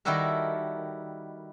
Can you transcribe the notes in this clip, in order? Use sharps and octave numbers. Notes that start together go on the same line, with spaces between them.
D#3 G3 E4 F#4 A4 A#4